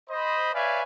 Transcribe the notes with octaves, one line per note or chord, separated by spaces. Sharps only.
C5 D#5 B5
B4 C#5 D5 E5 F5 G#5